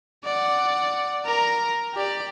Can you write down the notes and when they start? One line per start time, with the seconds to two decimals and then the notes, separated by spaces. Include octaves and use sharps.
0.24 D5 F#5
1.25 A#4 A#5
1.94 G4 D5